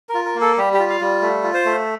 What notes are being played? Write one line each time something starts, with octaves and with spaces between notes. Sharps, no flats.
A#4
F4
A#4
A#3
A4
G3 G4
G4
F4
F5
G3
A3
F4
C5
A3